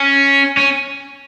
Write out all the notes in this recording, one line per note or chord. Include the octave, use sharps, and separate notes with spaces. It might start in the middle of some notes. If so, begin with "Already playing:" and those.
Already playing: C#4
C#4